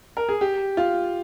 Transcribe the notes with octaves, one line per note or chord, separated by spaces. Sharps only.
A#4
G#4
G4
F4